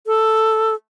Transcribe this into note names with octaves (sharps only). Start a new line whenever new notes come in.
A4